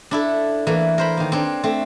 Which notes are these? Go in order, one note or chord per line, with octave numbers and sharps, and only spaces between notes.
D4 E4 A4
E3 A3 A#3
A#4 C5 B5
D#3 A#3
C4 D4 C#5
A3 C4